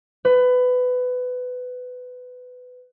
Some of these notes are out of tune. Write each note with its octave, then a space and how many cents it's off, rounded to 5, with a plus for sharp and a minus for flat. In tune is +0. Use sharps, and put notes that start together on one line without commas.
B4 +20